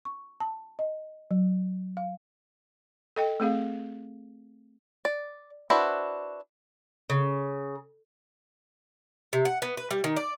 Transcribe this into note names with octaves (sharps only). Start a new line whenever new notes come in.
C#6
A5
D#5
F#3
F5
A4 D#5 G5
A3 C4 G#4 F5
D5
D4 E4 F#4 B4 C5
C#3
C3
F#5
B3
B4
G3
D#3
D5